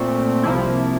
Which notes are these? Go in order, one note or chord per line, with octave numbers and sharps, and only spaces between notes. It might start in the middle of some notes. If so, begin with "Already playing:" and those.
Already playing: A#2 A3 C4
C2 C3 F3 A#3 E4